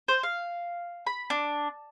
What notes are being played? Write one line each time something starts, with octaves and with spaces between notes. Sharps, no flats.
C5
F5
B5
D4